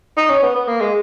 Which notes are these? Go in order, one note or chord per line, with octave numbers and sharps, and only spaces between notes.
D#4
C#4
B3
B3
A#3
G#3